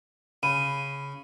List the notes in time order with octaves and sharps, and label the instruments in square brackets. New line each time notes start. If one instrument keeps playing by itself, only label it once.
[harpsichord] C#3 [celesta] B5 D#7